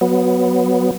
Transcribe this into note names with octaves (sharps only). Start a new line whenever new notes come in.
F#3 B3